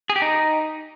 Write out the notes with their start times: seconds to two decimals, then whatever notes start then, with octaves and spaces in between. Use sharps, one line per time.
0.10 G#4
0.16 G4
0.22 D#4